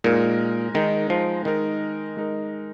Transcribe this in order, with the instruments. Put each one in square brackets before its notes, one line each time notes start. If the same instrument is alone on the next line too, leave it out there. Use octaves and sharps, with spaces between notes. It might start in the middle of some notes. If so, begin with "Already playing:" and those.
[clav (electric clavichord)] A#2 [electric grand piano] G#3 D#4 A#4
[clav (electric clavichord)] D#3 [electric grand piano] G#3 D#4 A#4
[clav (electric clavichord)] F3
[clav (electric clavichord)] D#3 [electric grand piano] G#3 D#4 A#4
[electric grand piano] G#3 D#4 A#4